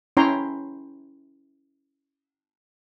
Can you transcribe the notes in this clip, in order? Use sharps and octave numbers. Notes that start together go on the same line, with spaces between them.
C#4 E4 C#5 G5 A#5 C6